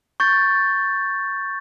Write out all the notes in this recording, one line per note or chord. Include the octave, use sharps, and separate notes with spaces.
C#6 G6 A6